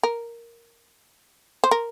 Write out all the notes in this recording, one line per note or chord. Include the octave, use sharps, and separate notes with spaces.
A#4
C5
A#4